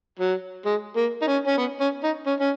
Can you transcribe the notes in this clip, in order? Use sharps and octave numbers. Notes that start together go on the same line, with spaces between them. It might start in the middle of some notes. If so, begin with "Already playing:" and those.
F#3
G#3
A#3
D#4
C#4
C#4
B3
C#4
D#4
C#4
C#4